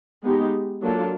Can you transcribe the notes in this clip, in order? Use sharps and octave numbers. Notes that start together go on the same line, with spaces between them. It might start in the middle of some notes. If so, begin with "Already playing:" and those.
G#3 B3 D#4 G4
F#3 A#3 D4 F4 A4